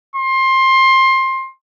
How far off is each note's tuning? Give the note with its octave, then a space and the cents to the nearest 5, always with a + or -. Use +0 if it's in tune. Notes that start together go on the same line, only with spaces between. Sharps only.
C6 +20